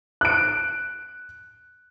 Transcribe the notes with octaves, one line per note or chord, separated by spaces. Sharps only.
F#6 D7